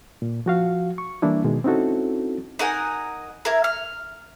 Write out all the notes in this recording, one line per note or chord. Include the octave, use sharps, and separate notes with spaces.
A#2
F3 F#4 F5
C#6
E3 G3 A#3 D4 E4
B2 D#3 G#3
C4 C#4 D#4 E4 F#4 A4
D#4 A#4 F#5 G#5
E4 A#4
F6